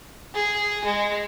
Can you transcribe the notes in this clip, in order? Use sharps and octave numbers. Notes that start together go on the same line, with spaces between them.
G#4
G#3